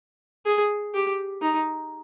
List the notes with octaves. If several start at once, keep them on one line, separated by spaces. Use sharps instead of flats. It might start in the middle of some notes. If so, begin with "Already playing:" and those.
G#4
G4
D#4